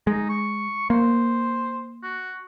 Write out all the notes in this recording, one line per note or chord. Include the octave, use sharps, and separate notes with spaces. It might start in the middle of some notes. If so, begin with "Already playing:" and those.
G#3 D#4
C#6
A#3 C5
F#4